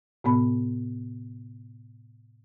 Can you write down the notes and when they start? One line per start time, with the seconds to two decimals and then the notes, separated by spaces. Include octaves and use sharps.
0.24 A2 C3 B3 B5